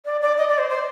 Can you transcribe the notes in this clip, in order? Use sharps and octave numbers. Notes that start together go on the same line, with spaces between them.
D5
D5
D#5
D5
C5
C5